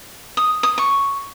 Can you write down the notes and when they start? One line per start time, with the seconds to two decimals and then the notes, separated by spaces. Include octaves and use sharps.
0.37 D#6
0.63 D#6
0.78 C#6